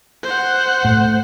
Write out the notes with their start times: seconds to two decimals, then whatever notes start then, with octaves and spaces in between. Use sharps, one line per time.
0.23 C5 F#5
0.85 A2